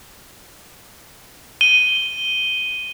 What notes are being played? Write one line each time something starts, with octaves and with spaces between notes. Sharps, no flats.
D#7 G7